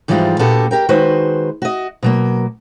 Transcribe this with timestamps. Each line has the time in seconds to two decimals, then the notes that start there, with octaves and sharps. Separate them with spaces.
0.08 G#2 E3 F3 G3 G#3 F4
0.39 A#2 B3 D4 F#4 G4 A4
0.71 G4 A#4 G5
0.89 D#3 G#3 F#4 B4 C5
1.62 F#4 D#5
2.03 B2 F#3 A#3